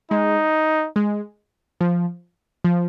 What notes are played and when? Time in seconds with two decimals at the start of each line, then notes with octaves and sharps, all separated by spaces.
0.11 G#3 D#4
0.96 G#3
1.81 F3
2.64 F3